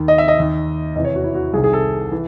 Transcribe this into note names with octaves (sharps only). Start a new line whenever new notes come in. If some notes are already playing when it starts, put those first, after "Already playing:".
Already playing: D#2 D#3
D#5
E5
D#5
D#2 D#3
E2 C3 E3 D#5
C#5
F#4
E4
F#4
C2 C3 D#3 G#4
G#4
A4
E3